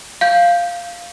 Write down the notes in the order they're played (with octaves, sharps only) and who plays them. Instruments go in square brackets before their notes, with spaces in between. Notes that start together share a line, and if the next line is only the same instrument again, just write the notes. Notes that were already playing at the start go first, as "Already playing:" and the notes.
[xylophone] F5 G6